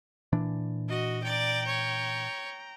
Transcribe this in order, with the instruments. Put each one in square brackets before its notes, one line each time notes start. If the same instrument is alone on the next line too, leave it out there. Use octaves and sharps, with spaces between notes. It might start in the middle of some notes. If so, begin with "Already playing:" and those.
[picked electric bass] A#2 E3 D4
[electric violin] F#4 [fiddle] D#5
[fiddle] D5 [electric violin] G5 A#5
[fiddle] C#5